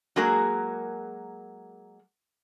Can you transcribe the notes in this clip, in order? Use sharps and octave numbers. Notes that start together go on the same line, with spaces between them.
F#3 G#3 A#3 F#4 G#4 A#4